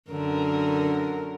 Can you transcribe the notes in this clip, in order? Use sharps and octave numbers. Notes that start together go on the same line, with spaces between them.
F#2 D3 A#4